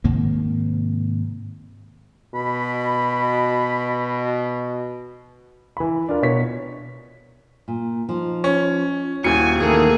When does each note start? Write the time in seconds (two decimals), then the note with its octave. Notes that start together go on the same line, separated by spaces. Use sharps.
0.04 G#2 C3 D#3 A#3
2.35 B2 B5
5.77 E3 B5
6.09 D4 F4 A#4
6.22 B2 C#5 B6
7.68 A#2
8.09 F3 D#4
8.44 C#4
9.24 D#1 E4 F#4 G#5 C#7
9.59 C3 D#3 E3 A3 A#3 G#4